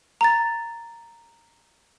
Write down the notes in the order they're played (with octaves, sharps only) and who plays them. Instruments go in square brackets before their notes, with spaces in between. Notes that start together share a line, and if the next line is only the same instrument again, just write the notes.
[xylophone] A#5 A6